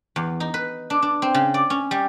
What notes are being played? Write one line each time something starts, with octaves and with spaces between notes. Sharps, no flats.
E2
D#4
B4
D4
D4
C4
C#3
D5
C#4
G3